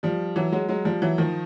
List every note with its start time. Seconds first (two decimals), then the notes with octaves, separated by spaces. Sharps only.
0.03 F3 G3
0.36 E3 F#3
0.52 F#3 G#3
0.68 F#3 G#3
0.85 F3 G3
1.02 E3 F#3
1.18 D#3 F3